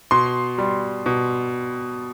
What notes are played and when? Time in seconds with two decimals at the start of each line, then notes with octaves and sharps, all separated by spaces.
0.11 B2 C6
0.58 G3
1.06 B2